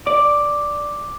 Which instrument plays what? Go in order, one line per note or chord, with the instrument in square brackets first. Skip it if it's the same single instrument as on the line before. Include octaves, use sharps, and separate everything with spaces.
[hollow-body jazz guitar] D5 [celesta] D6